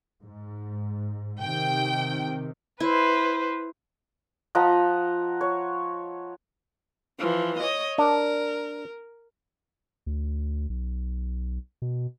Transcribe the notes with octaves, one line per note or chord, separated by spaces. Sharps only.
G#2
C3 D#3 G5
E4 B4 C5
F3 D#5 F#5 A#5
C#5
E3 F3
C#5 D#5
D4 A#4
D2
B1
B2